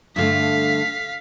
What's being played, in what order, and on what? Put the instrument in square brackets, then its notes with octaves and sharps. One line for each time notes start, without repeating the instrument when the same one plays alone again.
[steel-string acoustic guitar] G2 D3 A3 [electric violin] F5 B6